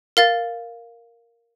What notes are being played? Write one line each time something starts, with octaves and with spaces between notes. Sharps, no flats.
A#4 F5 A6